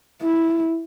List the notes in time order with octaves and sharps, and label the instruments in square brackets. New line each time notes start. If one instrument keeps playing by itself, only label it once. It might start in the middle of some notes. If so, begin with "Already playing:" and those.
[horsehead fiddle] E4